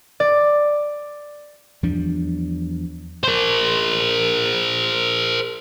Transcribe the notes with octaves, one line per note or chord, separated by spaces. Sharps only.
D5
E2 F3 G3 D4
A#4 C5